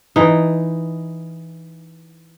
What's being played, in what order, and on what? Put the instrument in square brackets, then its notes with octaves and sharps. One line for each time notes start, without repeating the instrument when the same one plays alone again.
[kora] E3 D#4